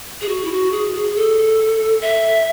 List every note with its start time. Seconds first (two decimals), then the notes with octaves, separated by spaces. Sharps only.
0.21 G#4
0.29 F#4
0.45 E4
0.52 F#4
0.72 G#4
0.95 G#4
1.16 A4
2.02 E5